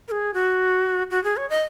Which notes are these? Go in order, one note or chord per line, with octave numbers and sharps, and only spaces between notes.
A#4
G#4
F#4
F#4
G#4
C#5
D#5